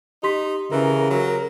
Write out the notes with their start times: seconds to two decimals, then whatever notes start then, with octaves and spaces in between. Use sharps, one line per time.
0.23 D#4 G4 C6 B6
0.72 C#3 E3 A#4
1.10 F#3